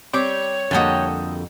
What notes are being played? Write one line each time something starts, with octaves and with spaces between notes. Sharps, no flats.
G3 C4 C#5 D6
F2 D3 G3 A#3 F#4 D#5 G5 A5